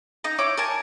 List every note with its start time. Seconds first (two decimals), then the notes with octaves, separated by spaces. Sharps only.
0.24 D#4 A#5
0.38 E4 C#5 D6
0.57 A#4 G#5 A5